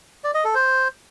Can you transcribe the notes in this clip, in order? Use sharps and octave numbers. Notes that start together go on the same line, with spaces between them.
D5
D#5
A4
C5